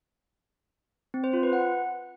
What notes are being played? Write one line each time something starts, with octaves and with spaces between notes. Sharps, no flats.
C4
C5
F4
B4
F#5